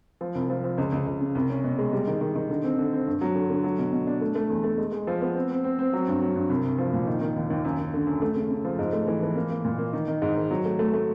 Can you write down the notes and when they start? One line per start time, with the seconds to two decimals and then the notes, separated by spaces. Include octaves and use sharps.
0.21 F3
0.35 C2
0.50 F3
0.64 F3
0.78 C#2
0.92 C#2
1.06 C#2
1.21 C#3
1.35 C2
1.50 C#4
1.64 B2
1.78 G#3
1.93 G3
2.07 D#3
2.21 D#3
2.35 D#3
2.50 D3
2.63 C4
2.78 D3
2.93 C4
3.07 G2
3.21 F#3
3.35 D3
3.50 D3
3.64 F#3
3.78 B2
3.92 B2
4.07 D4
4.21 A3
4.35 A3
4.50 E2
4.64 A3
4.78 G#3
4.92 G#3
5.07 F3
5.21 B3
5.35 C4
5.51 C4
5.64 C4
5.79 C4
5.93 F#3
6.08 G2
6.21 F#3
6.36 G2
6.50 C2
6.65 C2
6.78 F3
6.93 A#2
7.07 D#3
7.21 D#3
7.36 D#2
7.50 D#2
7.65 F#2
7.79 F#2
7.94 D3
8.07 F#2
8.22 A3
8.36 C#3
8.50 C#3
8.64 F3
8.79 G#2
8.93 A3
9.07 E3
9.22 E3
9.35 A#3
9.50 A#3
9.64 A#2
9.78 A#3
9.93 D#3
10.08 D#3
10.22 G#2
10.36 D#3
10.51 F#3
10.65 A3
10.79 A3
10.93 A3